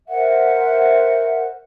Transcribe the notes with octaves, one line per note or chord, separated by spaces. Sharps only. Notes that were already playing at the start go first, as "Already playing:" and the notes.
A#4 C5 E5 F#5